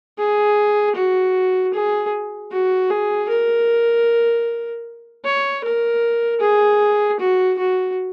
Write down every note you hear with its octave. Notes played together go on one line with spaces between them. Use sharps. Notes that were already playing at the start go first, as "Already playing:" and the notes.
G#4
F#4
G#4
F#4
G#4
A#4
C#5
A#4
G#4
F#4
F#4